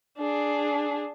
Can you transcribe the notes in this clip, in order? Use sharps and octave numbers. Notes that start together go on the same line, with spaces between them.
D4 G#4